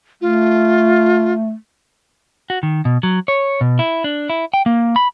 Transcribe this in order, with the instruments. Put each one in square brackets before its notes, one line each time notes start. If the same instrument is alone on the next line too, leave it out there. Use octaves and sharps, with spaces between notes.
[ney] A3 [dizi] F4
[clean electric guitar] F#4
D#3
B2
F#3
C#5
B2
E4
D4
E4
G5
A#3
B5